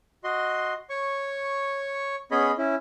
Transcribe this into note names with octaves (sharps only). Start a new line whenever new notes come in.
F#4 D#5 C6
C#5 C#6
B3 C#4 G#4 C#5 D#5 B5
C#4 E4